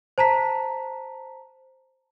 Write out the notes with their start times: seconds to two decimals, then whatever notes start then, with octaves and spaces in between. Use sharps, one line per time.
0.18 C5 A5 A#5 B6